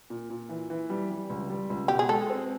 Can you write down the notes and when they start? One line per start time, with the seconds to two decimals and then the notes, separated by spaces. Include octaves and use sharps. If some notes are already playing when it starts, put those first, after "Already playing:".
0.10 A#2
0.30 A#2
0.49 E3
0.70 E3
0.90 G3
1.10 G3
1.30 C#2
1.50 G3
1.70 C#2
1.88 B2 G4
1.99 G#4
2.09 G#3 A4
2.30 C4